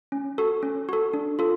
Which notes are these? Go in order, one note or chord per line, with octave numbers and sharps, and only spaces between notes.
C#4
F#4 A4
C#4
F#4 A4
D4
F4 A4